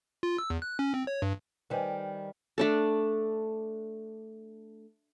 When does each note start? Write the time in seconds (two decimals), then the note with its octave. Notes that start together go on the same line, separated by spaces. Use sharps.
0.23 F4
0.38 E6
0.50 E2
0.62 F#6
0.79 C#4
0.94 C4
1.07 C#5
1.22 G2
1.70 D#3 G3 B4 C5 G#5
2.58 A3 D4 A4